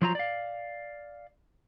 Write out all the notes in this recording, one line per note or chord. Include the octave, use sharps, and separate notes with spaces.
F3 F#3 F4 C5 D5 A#5
D5 F5